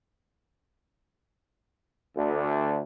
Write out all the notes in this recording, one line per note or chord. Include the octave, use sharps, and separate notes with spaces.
D2